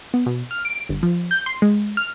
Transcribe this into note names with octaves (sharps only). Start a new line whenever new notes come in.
B3
B2
F6
D7
G1
F3
G6
C6
G#3
F6